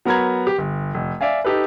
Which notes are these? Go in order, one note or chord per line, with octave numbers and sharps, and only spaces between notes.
F#3 B3 A#4 A#5 B5 G#6
G4
G1
F1
D5 E5 F5 G#5
D#4 G4 A4 B4